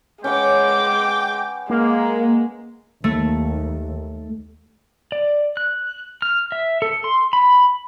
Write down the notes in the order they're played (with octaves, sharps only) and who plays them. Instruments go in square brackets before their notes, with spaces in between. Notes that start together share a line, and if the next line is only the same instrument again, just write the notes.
[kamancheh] G#3 D6 [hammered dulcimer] C#4 B4 F#5 [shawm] G5
[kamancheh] G#3 [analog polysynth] A#3
[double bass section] D#2 [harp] A3
[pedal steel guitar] D5
F#6
F6
E5
A4
C6
B5